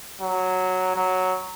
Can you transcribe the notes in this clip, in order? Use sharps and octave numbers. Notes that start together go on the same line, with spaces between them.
F#3
F#3